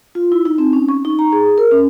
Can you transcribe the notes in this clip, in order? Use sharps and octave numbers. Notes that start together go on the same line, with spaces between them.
F4
E4
D#4
C4
C#4
C#6
D#4
A#5
G#4
A#4
C#4